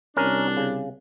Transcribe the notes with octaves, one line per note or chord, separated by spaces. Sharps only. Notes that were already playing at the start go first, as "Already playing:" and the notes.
C2 C#4 D4 A#4
C#3